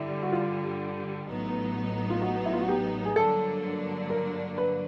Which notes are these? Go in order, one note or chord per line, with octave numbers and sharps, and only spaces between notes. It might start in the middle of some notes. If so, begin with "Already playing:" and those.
Already playing: G2 D3 G3 E4
F#4
F4
A1 A2 F#3 B3 D#4
F4
F#4
E4
F4
F#4
G4
G#4
G2 D3 F#3 A#3 D4 A4
A#4
B4